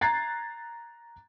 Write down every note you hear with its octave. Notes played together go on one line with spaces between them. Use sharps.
A#5 F#6 G#6 A6 C7